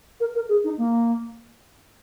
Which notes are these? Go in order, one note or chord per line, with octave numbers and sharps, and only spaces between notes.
A#4
A#4
G#4
D#4
A#3